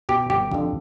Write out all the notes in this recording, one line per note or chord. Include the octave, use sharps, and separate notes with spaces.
B2 G4
G1 G4
F2 D3